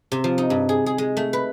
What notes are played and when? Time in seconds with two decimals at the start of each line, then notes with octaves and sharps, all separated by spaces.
0.12 C3
0.24 F3
0.38 D#4
0.50 G2
0.69 G#4
0.86 G#4
0.98 G#3
1.17 A3
1.33 B4